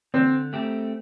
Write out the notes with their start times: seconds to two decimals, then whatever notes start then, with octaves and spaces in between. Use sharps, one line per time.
0.14 D3 C4
0.53 A3 C4 G4